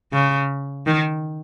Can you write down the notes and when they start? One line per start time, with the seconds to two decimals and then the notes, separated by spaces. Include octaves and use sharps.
0.13 C#3
0.87 D#3